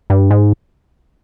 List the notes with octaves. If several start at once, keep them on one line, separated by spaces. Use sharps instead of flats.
G2
G#2